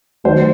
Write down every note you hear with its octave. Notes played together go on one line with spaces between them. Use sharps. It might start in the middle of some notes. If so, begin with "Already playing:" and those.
D#3 F#3 A3 C5